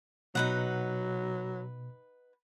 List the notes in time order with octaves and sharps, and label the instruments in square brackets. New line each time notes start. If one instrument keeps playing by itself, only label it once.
[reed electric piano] B2 [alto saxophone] F#3 [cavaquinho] D#4 B4 F#5